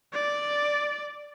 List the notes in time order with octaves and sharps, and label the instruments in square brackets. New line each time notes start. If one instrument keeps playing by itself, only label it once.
[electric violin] D5